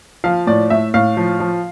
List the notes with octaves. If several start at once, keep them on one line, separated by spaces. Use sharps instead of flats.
F3 F5
A2 D5
A2 E5
A2 F5
F3
F3